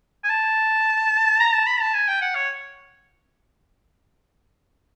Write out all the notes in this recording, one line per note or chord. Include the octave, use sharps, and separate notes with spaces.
G#5
A5
A#5
A5
B5
A5
G#5
G5
F#5
C#5